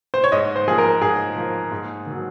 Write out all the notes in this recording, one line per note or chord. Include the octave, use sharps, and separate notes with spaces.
C5
C#5
G#2 D#5
C5
F3 A#3 G#4
A#4
G#2 G#4
F3 A#3
G#2
D#3 F#3